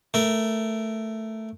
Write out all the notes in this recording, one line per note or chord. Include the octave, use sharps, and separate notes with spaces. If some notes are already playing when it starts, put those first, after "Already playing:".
A3 A#4